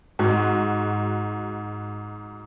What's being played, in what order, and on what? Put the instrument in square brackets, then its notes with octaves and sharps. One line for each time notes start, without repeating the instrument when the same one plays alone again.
[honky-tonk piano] G#2 F#4